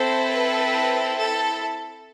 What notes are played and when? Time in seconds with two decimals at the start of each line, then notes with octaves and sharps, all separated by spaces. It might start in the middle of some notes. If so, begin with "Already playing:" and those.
Already playing: C4 E4 A4 C5
0.30 B4
1.20 A4